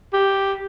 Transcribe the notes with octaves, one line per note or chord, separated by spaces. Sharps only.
G4